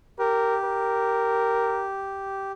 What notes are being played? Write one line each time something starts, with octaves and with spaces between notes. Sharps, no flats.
G4 A#4
A#4